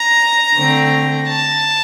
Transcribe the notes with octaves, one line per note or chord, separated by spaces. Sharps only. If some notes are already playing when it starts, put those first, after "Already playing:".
Already playing: A#5
D3 A3 C4
A5